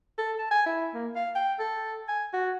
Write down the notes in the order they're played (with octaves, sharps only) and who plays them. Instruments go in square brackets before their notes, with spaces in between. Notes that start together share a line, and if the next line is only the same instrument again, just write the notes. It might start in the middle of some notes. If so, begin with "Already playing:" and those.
[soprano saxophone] A4
A5
G#5
E4
A#3
F5
G5
A4
G#5
F#4